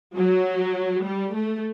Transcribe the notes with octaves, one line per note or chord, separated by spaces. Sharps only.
F#3
G3
A3